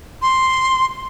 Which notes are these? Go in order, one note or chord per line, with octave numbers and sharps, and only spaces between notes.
C6